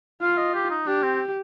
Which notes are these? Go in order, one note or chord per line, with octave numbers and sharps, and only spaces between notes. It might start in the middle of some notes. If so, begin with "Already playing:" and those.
F4 F5
D#5
G4
D#4
D4 G4
C4